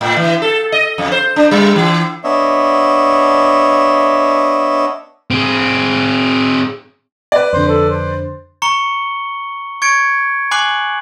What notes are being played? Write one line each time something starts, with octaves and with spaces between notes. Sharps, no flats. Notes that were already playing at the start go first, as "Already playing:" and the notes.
A2
E3
A4
D#5
F2
C5
D4
G3
E3
B3 D4 C#5 D#5 E5
C4 G#4
B4 D5
F2 D3 C5
A4
C5
A#5 C#6 C#7 G7
C#6 G#6 C#7 D7
G#5 B5 D6 F#6 C7 F#7